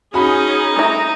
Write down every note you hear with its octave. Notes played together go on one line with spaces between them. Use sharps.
C#4 D#4 F#4 G#4 B5
A3 E4 A#5